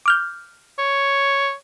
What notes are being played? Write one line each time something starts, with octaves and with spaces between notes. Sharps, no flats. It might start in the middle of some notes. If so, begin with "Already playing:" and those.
D6 F6 G6
C#5